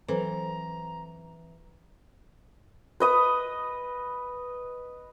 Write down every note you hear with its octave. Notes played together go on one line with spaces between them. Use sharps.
E3 F#3 C4 A4 B4 A#5
B4 D#5 D#6